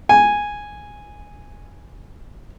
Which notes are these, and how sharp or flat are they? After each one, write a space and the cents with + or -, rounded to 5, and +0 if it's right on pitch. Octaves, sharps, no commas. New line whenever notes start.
G#5 -5